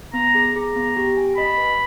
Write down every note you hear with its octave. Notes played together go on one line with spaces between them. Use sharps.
B3 A#5
G#4
G#4 A#5
B3
G4
G#5
D#5 B5
B4